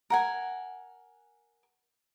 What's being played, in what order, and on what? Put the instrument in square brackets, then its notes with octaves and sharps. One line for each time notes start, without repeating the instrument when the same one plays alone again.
[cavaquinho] A#4 F#5 G#5